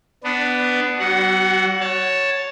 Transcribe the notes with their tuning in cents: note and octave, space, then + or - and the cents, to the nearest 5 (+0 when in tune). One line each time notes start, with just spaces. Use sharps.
B3 +10 D4 +0
G3 -40 F#4 +20 F#5 +0
C#5 +0 A5 +0